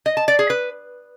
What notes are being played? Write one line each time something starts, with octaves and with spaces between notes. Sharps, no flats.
D#5
A5
D5
G#4
B4